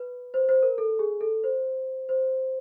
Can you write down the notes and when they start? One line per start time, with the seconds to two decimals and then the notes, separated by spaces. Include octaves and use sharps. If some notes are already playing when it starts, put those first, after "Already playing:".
Already playing: B4
0.34 C5
0.49 C5
0.63 A#4
0.78 A4
0.99 G#4
1.21 A4
1.44 C5
2.09 C5